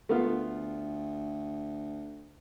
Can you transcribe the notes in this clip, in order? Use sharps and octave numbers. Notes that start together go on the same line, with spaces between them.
D2 A3 B3 F4